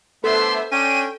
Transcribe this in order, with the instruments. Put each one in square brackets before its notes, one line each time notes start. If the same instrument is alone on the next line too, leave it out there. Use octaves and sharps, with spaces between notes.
[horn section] A3 B3 D4 [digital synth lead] A4 [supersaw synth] C5 E5 [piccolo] C6
[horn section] C#4 D4 [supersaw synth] G5 [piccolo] D#7